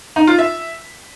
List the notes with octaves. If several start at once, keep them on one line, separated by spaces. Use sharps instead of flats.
D#4
F4
E5